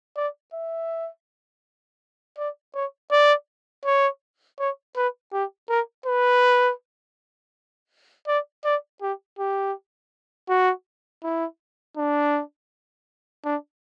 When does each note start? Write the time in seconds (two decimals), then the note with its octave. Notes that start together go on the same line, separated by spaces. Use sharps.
0.16 D5
0.53 E5
2.38 D5
2.74 C#5
3.11 D5
3.85 C#5
4.59 C#5
4.96 B4
5.33 G4
5.69 A#4
6.06 B4
8.27 D5
8.65 D5
9.02 G4
9.39 G4
10.49 F#4
11.23 E4
11.97 D4
13.45 D4